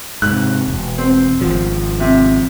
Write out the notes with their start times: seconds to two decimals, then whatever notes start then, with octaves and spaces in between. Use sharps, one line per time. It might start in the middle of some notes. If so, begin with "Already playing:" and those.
0.22 G#2 C3 F#6
0.68 E1
0.98 C4
1.41 G#1 F3
2.00 C3